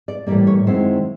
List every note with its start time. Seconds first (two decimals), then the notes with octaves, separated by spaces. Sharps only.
0.08 D5
0.27 A2 E3 G3 A#3 D5
0.47 C#5
0.66 F#2 D#3 G#3 C4 E4 C5